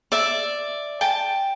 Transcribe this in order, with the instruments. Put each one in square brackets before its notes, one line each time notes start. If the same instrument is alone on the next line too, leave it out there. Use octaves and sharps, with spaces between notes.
[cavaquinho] D5 E5
G5 A5